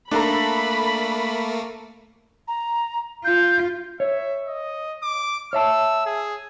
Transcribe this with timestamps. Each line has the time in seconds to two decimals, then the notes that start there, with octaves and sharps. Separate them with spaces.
0.11 A3 A#3 D4 A4 A#5 B5
2.48 A#5
3.25 F4 G6
4.00 C#5 E5
4.48 D#5
5.03 D6
5.53 C#5 E5 A5 E6
6.06 G#4